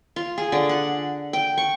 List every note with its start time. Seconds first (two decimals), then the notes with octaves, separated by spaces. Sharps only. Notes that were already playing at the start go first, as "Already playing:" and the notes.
0.16 F4
0.38 G#4
0.52 D3
0.69 F#5
1.33 G5
1.58 C#6